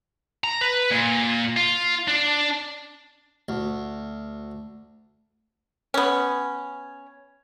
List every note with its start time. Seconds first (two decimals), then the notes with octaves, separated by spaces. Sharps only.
0.44 A#5
0.61 B4
0.91 A#2
1.56 F4
2.08 D4
3.49 D2
5.94 B3 C#4